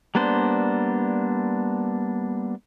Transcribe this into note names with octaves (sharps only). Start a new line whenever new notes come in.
G3 A#3 B3 D4 C5